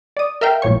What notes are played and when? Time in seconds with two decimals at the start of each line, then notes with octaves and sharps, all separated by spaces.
0.17 D5 D#6
0.41 A#4 E5 F5 G5
0.62 A#1 A#2 C#5 C#6